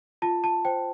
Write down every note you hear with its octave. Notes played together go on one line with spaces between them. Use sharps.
F4 A5
A5
C5 G5